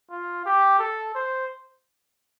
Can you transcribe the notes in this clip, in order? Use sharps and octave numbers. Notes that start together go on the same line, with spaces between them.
F4
G4
A4
C5